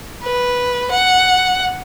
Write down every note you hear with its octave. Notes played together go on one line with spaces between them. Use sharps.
B4
F#5